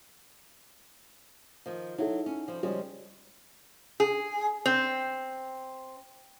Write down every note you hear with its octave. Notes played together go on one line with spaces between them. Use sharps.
D#3 F3
F#3 D#4 E4 A4
C#4
F3 G3
C#3 F3 G3 G#3
G#4
C4